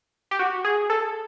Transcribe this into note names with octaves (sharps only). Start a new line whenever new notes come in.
G4
F#4
G#4
A4